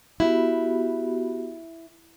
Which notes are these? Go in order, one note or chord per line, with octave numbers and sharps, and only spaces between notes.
B3 E4 F#4 G4